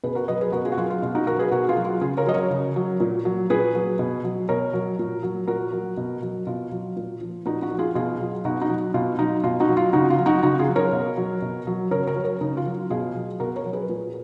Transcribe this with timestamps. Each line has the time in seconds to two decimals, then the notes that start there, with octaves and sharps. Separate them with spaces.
0.04 B2 G#4 B4
0.15 F#4 A#4
0.28 F#3 B4 D#5
0.41 G#4 B4
0.52 B2 F#4 A#4
0.65 F4 G#4
0.72 F#4
0.78 F#3 F4 G#4
0.90 F4
1.02 B2 F4
1.15 D#4 F#4
1.27 F#3 F#4 A#4
1.39 G#4 B4
1.52 B2 F#4 A#4
1.68 F4 G#4
1.76 F#3
1.85 F4
2.01 C#3 F4 G#4
2.17 A#4 C#5
2.26 F#3 D#5
2.34 A#4 C#5
2.51 C#3
2.76 F#3
3.00 A#2
3.25 F#3
3.50 A#2 G#4 B4
3.75 F#3
3.99 B2
4.24 F#3
4.49 B2 A#4 C#5
4.73 F#3
4.99 A#2
5.23 F#3
5.48 A#2 F#4 A#4
5.73 F#3
5.97 B2
6.22 F#3
6.47 B2 F4
6.72 F#3
6.96 A#2
7.21 F3
7.46 A#2 D#4 F#4
7.62 D#4 F#4
7.71 F3
7.79 F4 G#4
7.95 B2 F4 G#4
8.20 F#3
8.45 B2 D#4 F#4
8.62 D#4 F#4
8.70 F#3
8.94 B2 F4
9.19 F#3 D#4
9.44 B2 F4
9.60 D#4 F#4
9.68 F#3
9.77 F4
9.93 C#3 D#4 F#4
10.10 F4
10.18 F#3
10.26 D#4 F#4
10.43 C#3 D#4 F#4
10.59 F4 G#4
10.68 F#3
10.76 A#4 C#5
10.93 B2
11.17 F#3
11.42 B2
11.67 F#3
11.91 C#3 A#4 C#5
12.07 A#4 C#5
12.16 F#3
12.24 A#4 C#5
12.41 C#3 D#4
12.57 F4
12.66 F#3
12.90 B2 F4 G#4
13.15 F#3
13.40 B2 F#4 A#4
13.56 A#4 C#5
13.65 F#3
13.73 G#4 B4
13.89 A#2